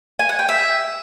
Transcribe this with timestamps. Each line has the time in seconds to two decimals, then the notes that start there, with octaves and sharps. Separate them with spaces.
0.19 G#5
0.29 F#5
0.39 G5
0.49 E5